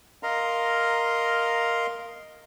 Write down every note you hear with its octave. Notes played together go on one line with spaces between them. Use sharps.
A#4 D#5 F5 A#5 C6